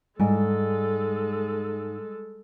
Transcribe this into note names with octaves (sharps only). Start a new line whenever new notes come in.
G#2 G3 G#3 A4